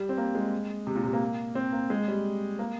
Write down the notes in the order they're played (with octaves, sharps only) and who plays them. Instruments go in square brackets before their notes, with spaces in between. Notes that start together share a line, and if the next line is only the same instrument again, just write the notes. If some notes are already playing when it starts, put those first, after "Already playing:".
Already playing: [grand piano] G3
C4
A#3
G#3
C3
A#2
C3
A#3
C4
A#3
G#3
G3
A#3